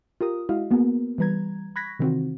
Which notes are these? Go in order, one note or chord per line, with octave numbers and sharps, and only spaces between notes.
F4 G4 A#4 D#6
G#3 E4 F#4 D#5 F5
A#3 B3 F#4 G#4 A#4
E3 G3 B4 A#5 G#6
B5 C#6 F#6 G#6 A#6 B6
C3 D#3 E3 C4 F4 F#4